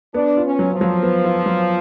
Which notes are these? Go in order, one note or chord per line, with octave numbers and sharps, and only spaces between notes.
B3 D4
F4
C#4
F#3
F3
F#3
B3
F4
F#3